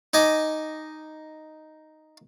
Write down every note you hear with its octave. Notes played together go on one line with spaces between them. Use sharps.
D#4 D#5 G#5 D6